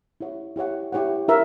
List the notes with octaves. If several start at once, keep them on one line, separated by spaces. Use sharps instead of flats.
E4 G4 C#5 F#5
E4 G4 C#5 F#5
E4 G4 C#5 F#5
E4 A#4 E5